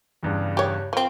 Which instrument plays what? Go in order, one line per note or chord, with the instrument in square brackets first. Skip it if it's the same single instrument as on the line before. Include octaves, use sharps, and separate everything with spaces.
[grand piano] E2 G2 C#3
[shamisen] G4 C#5
F3 C4